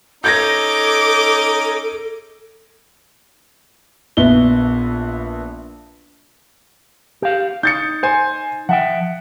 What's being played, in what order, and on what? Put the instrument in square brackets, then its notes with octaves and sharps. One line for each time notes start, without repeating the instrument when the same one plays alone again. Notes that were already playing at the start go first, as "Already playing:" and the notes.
[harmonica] C#4 D#4 [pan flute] A4 [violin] D6 [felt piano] G6 G#6 A#6
[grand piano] A#1 B3 E5 G7
[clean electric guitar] G4 F5
[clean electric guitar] D#4 [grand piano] G6 A6 C#7
[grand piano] C5 G#5
[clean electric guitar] F3 E5 G5 [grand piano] F#5